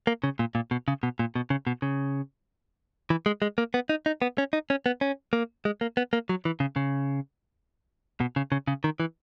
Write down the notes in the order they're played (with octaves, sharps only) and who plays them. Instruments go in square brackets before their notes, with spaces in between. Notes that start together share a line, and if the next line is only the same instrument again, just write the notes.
[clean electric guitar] A#3
C#3
A#2
A#2
B2
C#3
B2
A#2
B2
C#3
B2
C#3
E3
G#3
G#3
A#3
B3
D#4
D#4
B3
C#4
D#4
C#4
B3
C#4
A#3
G#3
A#3
B3
A#3
F#3
E3
C#3
C#3
B2
C#3
C#3
C#3
D#3
E3